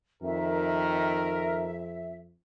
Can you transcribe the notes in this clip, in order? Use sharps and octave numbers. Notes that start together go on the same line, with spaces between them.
F2 D#3 A#4 E5